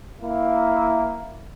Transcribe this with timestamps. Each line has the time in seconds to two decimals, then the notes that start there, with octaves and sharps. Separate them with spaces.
0.21 A#3 E4